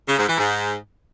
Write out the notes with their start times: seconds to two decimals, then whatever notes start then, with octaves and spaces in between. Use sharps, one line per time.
0.08 C#3
0.18 G#2
0.28 E3
0.38 G#2